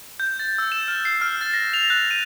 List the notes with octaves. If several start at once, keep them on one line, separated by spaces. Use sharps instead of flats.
G6
A6
E6
E7
F6
C7
F6
A6
A#6
F7
F#6
D#7